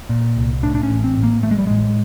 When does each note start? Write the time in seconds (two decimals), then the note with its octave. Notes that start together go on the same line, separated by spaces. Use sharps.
0.09 A#2
0.37 C2
0.63 A2 D4
0.75 D4
0.83 C#4
0.90 A1
1.04 C4
1.17 A2
1.23 A#3
1.43 A1 A3
1.51 G#3
1.58 G3
1.67 A2 G#3